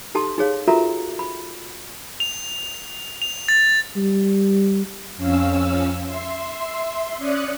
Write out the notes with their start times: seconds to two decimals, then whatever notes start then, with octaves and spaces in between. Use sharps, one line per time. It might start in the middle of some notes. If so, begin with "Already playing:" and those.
0.15 D#4 G4 A4 A5 C6
0.38 D#4 G#4 C#5 F5
0.68 F4 F#4 A4 A#4 E5 A#5
1.19 B5
2.20 F7
3.22 F7
3.48 A6
3.96 G3
5.16 F2 C#4 F5 E6
6.04 E5 C6
7.17 C#4 D5 D#6 F#6 C#7